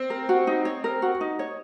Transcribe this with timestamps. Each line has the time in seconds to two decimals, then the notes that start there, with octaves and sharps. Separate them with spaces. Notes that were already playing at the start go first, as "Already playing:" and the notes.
Already playing: C4
0.10 A#4
0.29 F#4
0.47 D#4
0.65 C#5
0.84 A#4
1.02 F#4
1.21 D#4
1.39 C#5